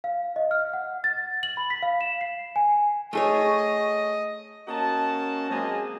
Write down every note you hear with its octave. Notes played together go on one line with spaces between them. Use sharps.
F5
D#5
F6
F#5
A6
F#7
B5
B6
F5
E7
C7
G#5
A3 G#4 C#5 D#5
A#3 C#4 F#4 D#5 A5
F#3 G#3 A#3 C4 G#4 D#5